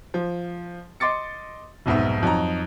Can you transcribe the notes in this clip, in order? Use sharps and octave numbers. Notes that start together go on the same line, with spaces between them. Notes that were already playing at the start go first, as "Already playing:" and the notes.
F3
D#5 C6 D6 A6 C#7
F1 B1 G#2 B3 E5
F2 F#3 D#4 A#5